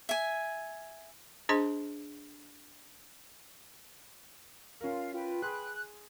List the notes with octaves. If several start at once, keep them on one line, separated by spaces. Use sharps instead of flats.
E5 G#5
D4 G#4 C5 D#5 A5 C6
C#4 F4 A#4 F5
F4 B4 G5
G#4 C6 F#6